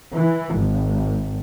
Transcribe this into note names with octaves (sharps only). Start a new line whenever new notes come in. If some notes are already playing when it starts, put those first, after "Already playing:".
E3
G#1